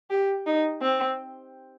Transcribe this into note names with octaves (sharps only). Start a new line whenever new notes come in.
G4
D#4
C4